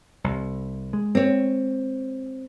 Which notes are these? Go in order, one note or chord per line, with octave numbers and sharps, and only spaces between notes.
C2
G#3
C4 C#5